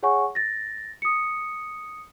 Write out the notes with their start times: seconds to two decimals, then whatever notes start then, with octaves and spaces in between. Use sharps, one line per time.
0.03 G#4 C#5 F#5 G#5 C#6
0.35 A6 A#6
1.02 D#6 C#7